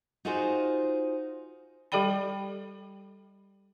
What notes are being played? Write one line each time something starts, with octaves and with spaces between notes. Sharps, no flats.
D#4 F4 F#4 G#4 C5
G3 G4 A4 D5 G5 B5